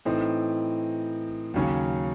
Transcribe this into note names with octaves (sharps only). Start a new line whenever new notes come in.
A2 E3 C4 D#4
D#2 C#3 F#3 C#4